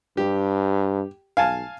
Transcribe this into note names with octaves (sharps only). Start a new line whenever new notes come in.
G2 G4
B1 F5 G#5 A5